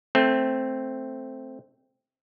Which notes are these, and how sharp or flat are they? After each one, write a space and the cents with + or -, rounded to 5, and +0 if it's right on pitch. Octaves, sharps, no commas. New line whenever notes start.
A3 +0 C4 +0